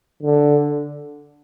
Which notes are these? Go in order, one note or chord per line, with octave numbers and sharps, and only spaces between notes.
D3